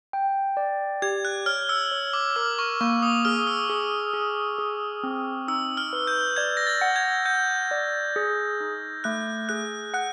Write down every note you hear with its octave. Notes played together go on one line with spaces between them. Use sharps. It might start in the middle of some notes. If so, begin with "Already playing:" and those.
G5
D5
G4 G#6
F#6
C#5 F6
E6
C#5
D6
A#4 D6
C#6
A#3 C#6
D#6
G#4 F6
E6
G#4
G#4
G#4
C4
D#4 E6
F6
B4
G6
D5 G#6
A#6
A6
F#5
G#6
F#5 G6
D5
G#4
D#4
A3 F#6
G#4 F#6
F#5 F#6